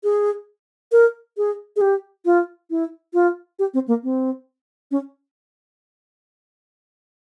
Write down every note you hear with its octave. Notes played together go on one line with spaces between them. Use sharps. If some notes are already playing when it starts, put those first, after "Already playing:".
G#4
A#4
G#4
G#4
G4
F4
E4
F4
G4
C4
A#3
C4
C#4